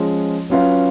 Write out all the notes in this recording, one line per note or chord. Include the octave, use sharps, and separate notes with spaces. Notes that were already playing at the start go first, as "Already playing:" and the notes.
Already playing: F3 G#3 C#4 F4
F#3 C#4 F4 B4 F5